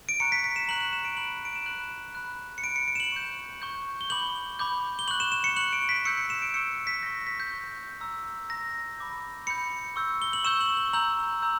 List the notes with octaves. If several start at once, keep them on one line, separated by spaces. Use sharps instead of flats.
D7
A#5 C#6 F#6 C#7
B6
B6
E7
A#5 C#6 F#6 F#7
F#7
E7
D7
B5 F#6 F#7
D7
E7
B5 F#6 F#7
B5 F#6
C#7
B5 F#6 D7
C#7
D7
E7
F#7
C#6 G6
C#6 G6
G7
B5 D6 G6 F#7
B5 D6 G6
G7
C#6 F#6 F#7
E7
E7
C#7
C#6 F#6 F#7
D7
B6
C#6 E6 G6 C#7
C#7
E7
D7
C#6 E6 G6 C#7
B6
C#6 G6 A#6
B6
G6
C#6 G6
A#5 E6 G6
A#5 E6 G6 A#6
B5 D6 G6
B5 D6 G6 C#7
C#6 E6 G6
G7
F#7
C#6 E6 G6 E7
F#7
F#7
A#5 E6 G6 F#7
A#5 E6 G6